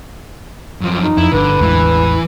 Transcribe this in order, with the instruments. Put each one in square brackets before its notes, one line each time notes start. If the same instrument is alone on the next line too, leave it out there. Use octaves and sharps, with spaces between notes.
[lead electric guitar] F#2 F3
[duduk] D#4
[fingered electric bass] F2 [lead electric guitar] E4
[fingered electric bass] G1 [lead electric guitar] D3 [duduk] B4
[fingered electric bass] A1 E2 G#3 [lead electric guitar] E3